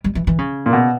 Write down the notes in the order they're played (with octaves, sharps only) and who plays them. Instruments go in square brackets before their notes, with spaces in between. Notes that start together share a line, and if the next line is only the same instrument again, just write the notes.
[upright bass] G3
E3
E3
C#3
[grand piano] A#2
B2